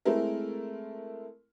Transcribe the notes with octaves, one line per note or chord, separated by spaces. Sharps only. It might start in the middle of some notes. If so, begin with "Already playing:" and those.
G#3 A3 C4 E4 A4 A#4